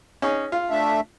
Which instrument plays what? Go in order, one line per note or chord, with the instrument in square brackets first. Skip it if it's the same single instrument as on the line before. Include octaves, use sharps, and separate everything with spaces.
[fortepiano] C#4 D#4 G#4
F4
[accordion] A3 D4 E5